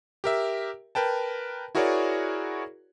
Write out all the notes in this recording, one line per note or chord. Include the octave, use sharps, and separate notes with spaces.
G4 A#4 E5
A#4 B4 G5 A5
E4 F#4 G#4 A#4 C#5 D5